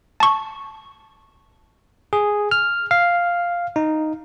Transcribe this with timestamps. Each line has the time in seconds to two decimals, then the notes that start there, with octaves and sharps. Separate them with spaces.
0.20 A5 C#6
2.13 G#4
2.51 F6
2.91 F5
3.76 D#4